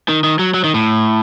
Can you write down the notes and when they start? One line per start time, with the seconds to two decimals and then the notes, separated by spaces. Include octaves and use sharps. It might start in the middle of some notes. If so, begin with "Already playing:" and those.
0.09 D#3
0.24 D#3
0.39 F#3
0.54 F#3
0.64 D#3
0.74 A2